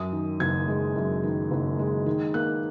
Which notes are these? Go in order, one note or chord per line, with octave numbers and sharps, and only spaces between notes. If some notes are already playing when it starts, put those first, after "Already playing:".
Already playing: F#2 D#6
D#3
F#1 G#6
G#3
F#2
D#3
F#1
G#3
D#3
A#3 F#6